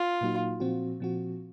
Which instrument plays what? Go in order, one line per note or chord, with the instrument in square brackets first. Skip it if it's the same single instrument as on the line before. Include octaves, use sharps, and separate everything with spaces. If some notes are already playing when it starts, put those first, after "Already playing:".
Already playing: [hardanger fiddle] F4
[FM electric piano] A#2 F#3 A#3 D#4 F#4
A#2 F3 C4 F#4
A#2 F3 C4 F#4